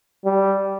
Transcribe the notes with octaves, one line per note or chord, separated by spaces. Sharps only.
G3